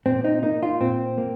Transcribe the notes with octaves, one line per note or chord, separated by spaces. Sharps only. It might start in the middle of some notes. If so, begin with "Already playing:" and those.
A#2 C4
D#4
A#3 D#4
F4
A#2 C4
A#3